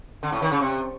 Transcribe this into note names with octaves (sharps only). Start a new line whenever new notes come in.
D3
A2
D#3
C#3
C3